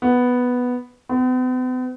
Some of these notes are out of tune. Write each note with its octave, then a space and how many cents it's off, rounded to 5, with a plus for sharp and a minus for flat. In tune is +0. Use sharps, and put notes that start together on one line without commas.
B3 +0
B3 +45